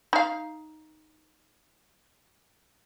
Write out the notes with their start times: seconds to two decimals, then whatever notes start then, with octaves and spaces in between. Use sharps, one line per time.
0.13 D#4 F5